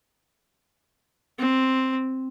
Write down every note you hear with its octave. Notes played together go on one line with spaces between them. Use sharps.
C4